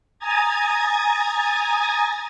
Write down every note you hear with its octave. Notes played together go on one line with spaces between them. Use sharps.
G#5 A#5 D#6 G#6 A6